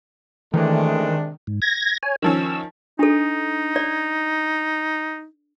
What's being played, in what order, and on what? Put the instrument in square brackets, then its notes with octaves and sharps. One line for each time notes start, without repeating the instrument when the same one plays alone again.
[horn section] C3 G#3 D4 [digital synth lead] D#3 [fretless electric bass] E3 [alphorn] A3
[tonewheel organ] G#2
G#6 A#6
C#5 G#5
[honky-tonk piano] D#3 F3 C#4 [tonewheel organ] E6
[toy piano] D4 A4 [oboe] D#4
[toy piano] D5